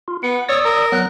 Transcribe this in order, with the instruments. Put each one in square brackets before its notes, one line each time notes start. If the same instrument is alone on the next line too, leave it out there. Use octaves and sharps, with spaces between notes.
[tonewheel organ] F4
[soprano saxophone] B3 [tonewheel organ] F#5
[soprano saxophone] C#5 [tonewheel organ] D5 D#6 E6
[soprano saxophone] A#4
[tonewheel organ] F#3 B3 F#6